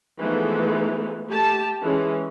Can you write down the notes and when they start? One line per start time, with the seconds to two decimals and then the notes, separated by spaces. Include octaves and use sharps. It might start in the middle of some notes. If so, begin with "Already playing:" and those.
0.19 E3 F3 G#3 A3 B3 D#4
1.27 A3 G4 A5
1.82 E3 G#3 C#4